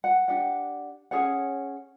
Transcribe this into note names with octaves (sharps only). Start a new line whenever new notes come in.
F#5
D4 G4 F#5
C#4 G#4 C#5 F#5